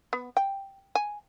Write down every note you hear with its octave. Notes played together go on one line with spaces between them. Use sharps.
B3
G5
G#5